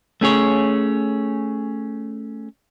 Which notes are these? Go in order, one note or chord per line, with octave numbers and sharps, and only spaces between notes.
A3 C#4 G#4 C#5